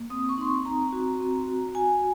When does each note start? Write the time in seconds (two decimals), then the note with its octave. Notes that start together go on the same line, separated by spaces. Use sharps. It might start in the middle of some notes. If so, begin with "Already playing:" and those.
Already playing: A#3
0.10 C4 D#6
0.29 C#6
0.38 D#4 C6
0.47 C#6
0.65 C4 A#5
0.92 F#4
1.20 C4
1.48 F#4
1.75 F#4 G#5